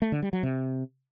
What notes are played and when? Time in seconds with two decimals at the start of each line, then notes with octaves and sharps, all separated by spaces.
0.02 A3
0.12 D3
0.22 G3
0.33 F#3
0.43 C3